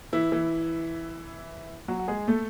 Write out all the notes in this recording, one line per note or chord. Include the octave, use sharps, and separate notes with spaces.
E3 E4
E3 E4
F#3 F#4
F#4
G#3 G#4
A3 A4